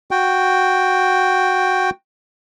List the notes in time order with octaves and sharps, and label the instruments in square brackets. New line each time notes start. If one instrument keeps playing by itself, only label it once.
[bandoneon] F#4 G5